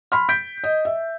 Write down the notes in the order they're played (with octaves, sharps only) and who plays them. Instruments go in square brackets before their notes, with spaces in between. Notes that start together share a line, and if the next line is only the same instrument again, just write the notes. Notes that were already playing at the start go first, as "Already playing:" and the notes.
[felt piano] B5 C6 F6
G6 B6 D7
D#5
E5